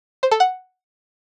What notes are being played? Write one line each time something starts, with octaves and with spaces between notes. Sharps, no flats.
C5
A4
F#5